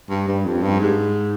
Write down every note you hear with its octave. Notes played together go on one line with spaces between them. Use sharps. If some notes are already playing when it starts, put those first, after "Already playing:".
G2
G2
F2
G2
G#2